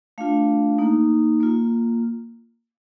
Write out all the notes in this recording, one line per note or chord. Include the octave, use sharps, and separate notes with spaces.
A3 D4 F4 F5
A#3 D#4
A#3 F4